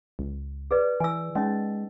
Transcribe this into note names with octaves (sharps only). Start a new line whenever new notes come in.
C#2
G#4 B4 D5
E3 G#5 E6
G#3 C#4 D#4 D#5